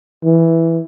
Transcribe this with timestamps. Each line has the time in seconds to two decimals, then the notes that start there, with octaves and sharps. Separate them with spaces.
0.24 E3